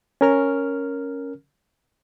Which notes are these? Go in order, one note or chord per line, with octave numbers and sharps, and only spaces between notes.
C#4 A#4 F6